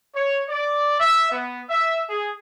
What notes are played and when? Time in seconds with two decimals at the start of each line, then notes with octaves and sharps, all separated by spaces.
0.14 C#5
0.49 D5
0.99 E5
1.30 B3
1.70 E5
2.10 G#4